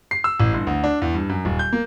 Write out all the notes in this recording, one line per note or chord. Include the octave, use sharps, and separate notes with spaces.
C7
E6
A1
G1
D2
D4
E2
G2
F#2
D#1
G6
A#3